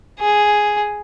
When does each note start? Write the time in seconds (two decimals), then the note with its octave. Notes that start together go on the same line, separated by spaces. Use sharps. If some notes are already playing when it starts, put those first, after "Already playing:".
0.19 G#4